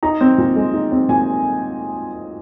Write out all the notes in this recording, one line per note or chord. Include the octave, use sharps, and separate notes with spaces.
D#4 A#5
C4
A#2
G#3
D#4
C4
A#2 G#5